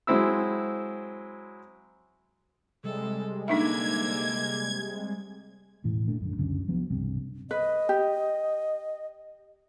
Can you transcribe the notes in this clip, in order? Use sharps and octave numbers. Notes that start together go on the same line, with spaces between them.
F#3 G#3 C4 E4 E6
C3 G3 G#3 A4
D3 A#3 D4 D#4 E5 G#6
E1 A2 E3
G1 A#2 A3 D4
A#1 F#2 D3
C#2 F#2 D3 C#4
C2 F3 F#3 B3
E1 C2 G2 C4
B4 D#5
G4